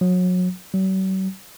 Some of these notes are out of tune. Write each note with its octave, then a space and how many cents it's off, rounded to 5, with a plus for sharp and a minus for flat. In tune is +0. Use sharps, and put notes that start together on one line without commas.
F#3 -30
F#3 +45